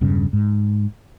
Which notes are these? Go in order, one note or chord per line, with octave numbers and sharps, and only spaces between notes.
E1 G2 C#3
G#2